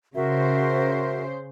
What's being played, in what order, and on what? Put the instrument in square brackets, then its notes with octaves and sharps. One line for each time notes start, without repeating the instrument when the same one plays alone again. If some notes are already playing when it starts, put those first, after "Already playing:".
[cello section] C#3 C5 [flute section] F#4 A#4 E5